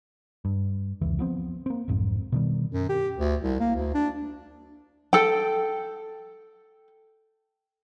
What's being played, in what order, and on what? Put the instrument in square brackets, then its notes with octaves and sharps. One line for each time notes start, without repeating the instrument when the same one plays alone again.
[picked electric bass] G2
F1 C#2 E3
F3 B3 C4
A#3 C4
B1 F2 G#2
B2 D#3 G3
[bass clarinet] F#2
G4
D2
C2
A#3
D2
D4
[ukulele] A4 G5